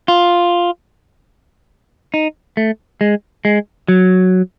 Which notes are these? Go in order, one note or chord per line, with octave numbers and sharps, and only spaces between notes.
F4
D#4
A3
G#3
G#3
F#3